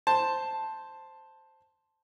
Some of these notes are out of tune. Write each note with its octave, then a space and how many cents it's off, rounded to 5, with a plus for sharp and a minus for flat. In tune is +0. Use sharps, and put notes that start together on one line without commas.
C5 +0 A5 +0